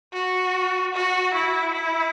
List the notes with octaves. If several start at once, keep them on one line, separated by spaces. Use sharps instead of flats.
F#4
F#4
E4
E4